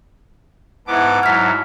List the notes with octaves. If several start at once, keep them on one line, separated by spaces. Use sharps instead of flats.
G#2 B3 E4 F#5 A5 D6
G#2 F#3 F6 B6